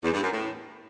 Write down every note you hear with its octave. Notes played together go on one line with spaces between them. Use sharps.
E2
G2
F#2
A2